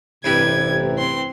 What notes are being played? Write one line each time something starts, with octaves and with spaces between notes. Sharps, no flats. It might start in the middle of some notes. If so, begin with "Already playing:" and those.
A1 G2 C3 E3 G3 G#6
C4 C6